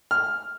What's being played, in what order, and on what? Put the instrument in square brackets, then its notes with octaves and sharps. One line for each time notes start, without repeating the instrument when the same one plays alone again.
[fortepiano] F6